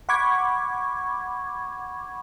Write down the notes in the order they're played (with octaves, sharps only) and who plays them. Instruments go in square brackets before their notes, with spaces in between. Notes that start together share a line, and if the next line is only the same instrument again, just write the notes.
[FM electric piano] F#5 B5 C#6 D6 G#6